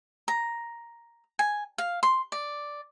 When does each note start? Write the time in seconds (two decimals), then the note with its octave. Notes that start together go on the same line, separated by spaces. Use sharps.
0.28 A#5
1.39 G#5
1.78 F5
2.03 C6
2.32 D5